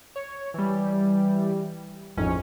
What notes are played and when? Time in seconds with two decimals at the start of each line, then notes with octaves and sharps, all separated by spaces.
0.16 C#5
0.54 E3 G3
2.17 A1 F2 G#2 C#4